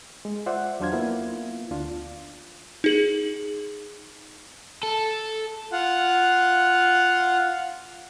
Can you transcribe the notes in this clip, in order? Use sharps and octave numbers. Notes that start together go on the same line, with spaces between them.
G#3
F4 C5 D5 E5 F#5
E2 F#3 D4 C5 F5 G#6
A#3 B3 E4 F4
D2 D4 F4
D#4 G#4 F#7
A4
F4 F#5